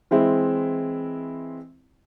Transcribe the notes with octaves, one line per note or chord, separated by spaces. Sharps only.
E3 G#3 C4 E4